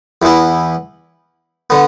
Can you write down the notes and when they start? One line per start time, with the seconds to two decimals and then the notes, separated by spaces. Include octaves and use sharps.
0.22 E2 E3 B3 E4
1.70 D3 B3